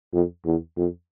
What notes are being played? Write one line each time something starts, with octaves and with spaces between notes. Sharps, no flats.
F2
E2
F2